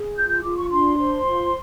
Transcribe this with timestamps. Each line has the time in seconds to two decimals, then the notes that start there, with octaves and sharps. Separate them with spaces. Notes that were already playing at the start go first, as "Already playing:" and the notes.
Already playing: G#4
0.16 F4 G6
0.29 G6
0.42 F4 D6
0.57 C#6
0.70 D4 C6
0.98 C5
1.25 F4